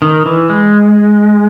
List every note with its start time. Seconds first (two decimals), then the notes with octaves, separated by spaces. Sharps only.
0.02 D#3
0.26 E3
0.49 G#3